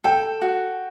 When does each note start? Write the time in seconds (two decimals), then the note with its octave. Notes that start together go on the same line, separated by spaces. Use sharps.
0.04 A4 G5
0.42 F#4